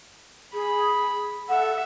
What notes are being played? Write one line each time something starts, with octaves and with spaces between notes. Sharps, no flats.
G#4 B5
A4 E5 F#5